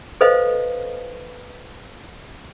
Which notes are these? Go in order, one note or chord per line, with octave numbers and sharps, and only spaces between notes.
A4 B4 C5 D#5 F5